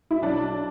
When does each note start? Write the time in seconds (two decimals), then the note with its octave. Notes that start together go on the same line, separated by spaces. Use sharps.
0.11 E4
0.22 B1 D4